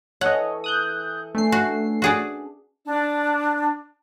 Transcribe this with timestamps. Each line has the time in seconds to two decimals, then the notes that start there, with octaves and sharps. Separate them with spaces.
0.21 E3 A4 C#5 D#5 F#5
0.64 D#6 F#6 G6
1.35 A3 C#4 D4 C7
1.52 F#4
2.02 F#4 G#4 D5
2.85 D4